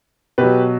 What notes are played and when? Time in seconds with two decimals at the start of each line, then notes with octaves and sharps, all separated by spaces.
0.38 B2 G4 B4
0.43 F#3